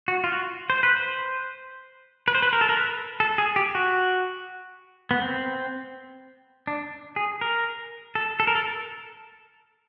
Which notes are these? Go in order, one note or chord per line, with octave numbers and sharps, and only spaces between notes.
F#4
F4
F#4
C5
B4
C5
B4
C5
B4
A#4
A4
A#4
B4
A4
G#4
G4
F#4
B3
C4
D4
G#4
A#4
A4
A4
A#4
A4